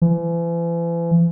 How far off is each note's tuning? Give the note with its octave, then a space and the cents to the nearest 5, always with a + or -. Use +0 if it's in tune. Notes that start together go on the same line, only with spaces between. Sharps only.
E3 +40